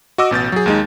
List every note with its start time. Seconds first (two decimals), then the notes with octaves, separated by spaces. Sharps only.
0.18 F#4 D#5 D6 E6
0.31 A1 B2 G6 A6
0.52 F#3 G#4
0.66 D#2 G#3 D#4